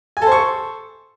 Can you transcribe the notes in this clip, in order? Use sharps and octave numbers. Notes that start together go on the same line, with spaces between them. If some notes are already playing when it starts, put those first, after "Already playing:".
A4 C5 G#5 C#6